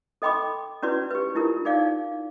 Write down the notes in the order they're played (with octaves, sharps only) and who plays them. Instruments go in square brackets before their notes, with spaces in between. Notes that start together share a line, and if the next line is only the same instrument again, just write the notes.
[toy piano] A4 D#5 G5 B5 C6 D6
C#4 E4 F#4 B4 D5 C6
G4 B4
D4 E4 F4 A#4
D#4 G#4 D5 F5